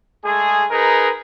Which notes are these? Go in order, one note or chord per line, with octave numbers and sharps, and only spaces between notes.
G#3 A3 G#4
D#4 G#4 A#4 B4